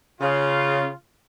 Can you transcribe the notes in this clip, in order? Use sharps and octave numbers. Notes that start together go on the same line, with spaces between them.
C#3 F4